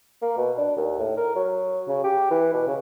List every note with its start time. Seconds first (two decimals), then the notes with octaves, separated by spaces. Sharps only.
0.22 A#3
0.37 B2
0.58 D4
0.77 D#2
0.99 A2
1.17 A#4
1.35 F#3
1.88 C#3
2.04 G4
2.31 E3
2.53 B2
2.67 C#3